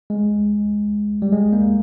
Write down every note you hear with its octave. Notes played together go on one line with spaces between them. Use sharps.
G#3
G3
G#3
A#3